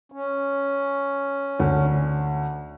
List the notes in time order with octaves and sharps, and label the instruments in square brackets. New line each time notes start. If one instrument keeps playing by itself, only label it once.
[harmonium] C#4
[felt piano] D2